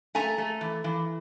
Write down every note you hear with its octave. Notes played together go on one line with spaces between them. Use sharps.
A3 G#5 A#5
A3
E3
E3